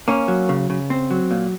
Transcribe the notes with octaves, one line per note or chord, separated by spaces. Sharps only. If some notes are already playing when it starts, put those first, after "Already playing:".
A#3 C#4
F#3
C#3
C#3
C4
F#3
A#2